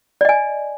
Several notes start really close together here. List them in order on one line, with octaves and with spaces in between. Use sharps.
D5 D#5 G#5